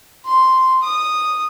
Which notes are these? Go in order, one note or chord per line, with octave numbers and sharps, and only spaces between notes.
C6
D#6